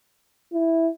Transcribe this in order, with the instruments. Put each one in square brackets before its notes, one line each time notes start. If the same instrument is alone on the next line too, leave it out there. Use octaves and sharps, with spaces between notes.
[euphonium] E4